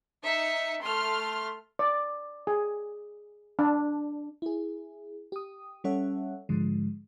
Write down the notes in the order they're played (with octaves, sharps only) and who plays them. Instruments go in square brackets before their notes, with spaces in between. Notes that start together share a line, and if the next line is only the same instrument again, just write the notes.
[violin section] D#4 E5 C#7
A3 C6 F6
[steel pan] D5
G#4
D4
[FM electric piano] E4 G#4
G4 D#6
G3 C#4 A4 C#5 E5 F#5
G#2 D3 F3 G#3